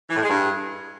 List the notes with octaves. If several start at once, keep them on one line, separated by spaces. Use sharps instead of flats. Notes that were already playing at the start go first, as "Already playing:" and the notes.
E3
A2
G#3
G2